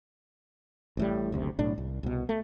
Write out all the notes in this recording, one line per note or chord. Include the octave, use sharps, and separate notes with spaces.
A1 A2 G3
F#1 D2 C3
B1 A2 D4
C2
C2 B2
A3